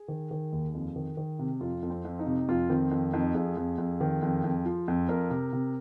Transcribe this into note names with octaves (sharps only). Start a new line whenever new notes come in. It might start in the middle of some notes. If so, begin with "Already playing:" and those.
Already playing: G#4
D#3
D#3
D#2
F2
D#3
D#3
C3
F2 F4
F2
C4
F2
D#4
C3
F2 F4
D#3 C4
F2
F2 D#4
F2 G#4
F2
F2
D#3
F2
F2
F3
F2
F2 A#4
C3
C3